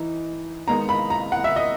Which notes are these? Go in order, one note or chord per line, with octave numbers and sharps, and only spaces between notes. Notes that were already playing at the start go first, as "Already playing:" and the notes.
Already playing: E3 D#4
D#3 G#3 B3 D#4 A#5
B5
A#5
F#5
E5
D#5